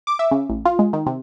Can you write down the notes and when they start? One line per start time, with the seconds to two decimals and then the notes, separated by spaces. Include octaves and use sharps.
0.07 D6
0.19 E5
0.31 C#3
0.49 A1
0.65 F4
0.79 G#3
0.93 D#3
1.06 C3